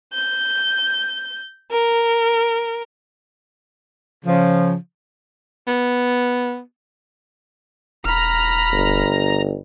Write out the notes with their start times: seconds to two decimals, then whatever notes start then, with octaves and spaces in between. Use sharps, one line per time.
0.13 G6
1.71 A#4
4.25 C#3 F3
5.68 B3
8.05 E1 A#5 B5 F6
8.72 G1